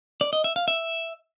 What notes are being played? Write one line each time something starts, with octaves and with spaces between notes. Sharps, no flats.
D5
D#5
E5
F5
E5